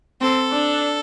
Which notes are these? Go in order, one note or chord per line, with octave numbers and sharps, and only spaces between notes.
C4 A4
D4